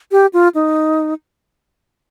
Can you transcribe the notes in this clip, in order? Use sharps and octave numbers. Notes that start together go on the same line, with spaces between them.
G4
F4
D#4